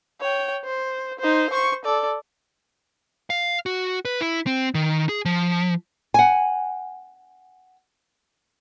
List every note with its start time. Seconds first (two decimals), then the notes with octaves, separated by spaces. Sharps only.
0.21 C#5 G5
0.64 C5
1.19 D#4 C5
1.50 C5 C#6
1.85 A4 D5
3.30 F5
3.66 F#4
4.05 B4
4.21 E4
4.47 C4
4.75 D#3
5.09 G#4
5.25 F3
6.14 F#5 G#5